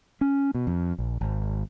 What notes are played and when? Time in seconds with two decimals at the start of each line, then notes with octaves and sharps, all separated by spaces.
0.21 C#4
0.55 B2
0.67 F2
0.99 A#1
1.21 G#1